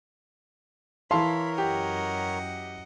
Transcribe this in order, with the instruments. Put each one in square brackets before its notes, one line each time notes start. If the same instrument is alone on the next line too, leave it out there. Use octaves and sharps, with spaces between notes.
[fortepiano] E3 F5 [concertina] A#4 C#5 [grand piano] A5 C6 [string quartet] B5
[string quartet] F#2 D#5 F#5 [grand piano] G4